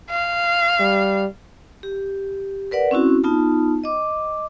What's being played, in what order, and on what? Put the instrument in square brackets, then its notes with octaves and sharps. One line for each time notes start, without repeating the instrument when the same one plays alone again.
[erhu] F5
[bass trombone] G3
[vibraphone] G4
A#4 B4 D5 F#5
C4 C#4 E4 F#4
B3 D#4 F4 A5
D#5 D6